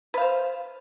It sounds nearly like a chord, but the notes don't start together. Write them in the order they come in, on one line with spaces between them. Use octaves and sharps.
B4 F5 C5